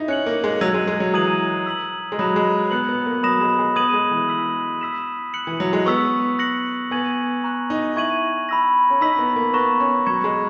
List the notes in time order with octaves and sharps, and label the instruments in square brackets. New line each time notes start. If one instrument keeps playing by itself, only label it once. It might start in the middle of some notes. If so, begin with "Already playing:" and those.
Already playing: [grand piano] D#4 E4
[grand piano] C#4 [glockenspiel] F#6 C#7 F#7
[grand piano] A#3
G#3
[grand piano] F#3 [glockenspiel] E6 G#6 D#7
[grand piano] G#3
G#3
F#3
[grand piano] E3 [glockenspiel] A#5 D#6 G#6 D#7 F#7
[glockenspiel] E6 B6 F#7
[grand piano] G#3
[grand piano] F#3 [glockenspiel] B5 D#6 F#6 A#6 E7
[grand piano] G#3
[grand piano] B3 [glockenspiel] F#6 C#7 F#7
[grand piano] B3
A#3
[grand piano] F#3 [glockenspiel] B5 D#6 A#6 E7
[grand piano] G#3
G#3
[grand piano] B3 [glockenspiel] D#6 G#6 D#7 F#7
[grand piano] G#3
E3
[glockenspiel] E6 B6 F#7
E6 B6 E7
F#6 C#7 F#7
[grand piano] E3
F#3
G#3
[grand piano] B3 [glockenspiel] C#6 E6 B6
[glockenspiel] F#6 A#6 C#7 F#7
[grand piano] B3 [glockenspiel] G#5 C#6 G#6 D#7 F#7
[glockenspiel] A#5 C#6 F#6
[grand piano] D#4
[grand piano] E4 [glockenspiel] C#6 G#6 D#7 F#7
[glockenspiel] B5 E6 A#6
[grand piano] C#4
[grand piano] D#4 [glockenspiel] A#5 E6 B6 F#7
[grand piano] B3
A#3
[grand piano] B3 [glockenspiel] A#5 C#6 F#6 A#6 E7
[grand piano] C#4
[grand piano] F#3 [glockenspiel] C#6 G#6 C#7 E7
[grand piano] G#3